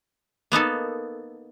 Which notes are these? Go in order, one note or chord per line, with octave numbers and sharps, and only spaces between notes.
A#3 B3 D#4 A4